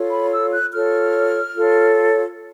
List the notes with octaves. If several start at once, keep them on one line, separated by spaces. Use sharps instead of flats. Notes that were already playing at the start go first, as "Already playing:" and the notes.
Already playing: F4 A4 C#5
B5
E6
F#6
F4 A4 C#5 F6
F4 A4 C#5